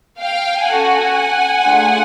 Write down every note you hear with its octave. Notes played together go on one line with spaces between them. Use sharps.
F5 G5
C#4 F#4 A4 F#5 G#5
A3 D4 F4 G#4